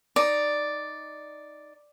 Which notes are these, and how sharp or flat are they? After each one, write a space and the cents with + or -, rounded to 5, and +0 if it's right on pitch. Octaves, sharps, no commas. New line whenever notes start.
D#4 +0 D5 +0